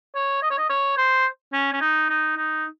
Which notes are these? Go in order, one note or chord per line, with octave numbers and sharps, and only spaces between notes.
C#5
D#5
C#5
D#5
C#5
C5
C#4
C#4
D#4
D#4
D#4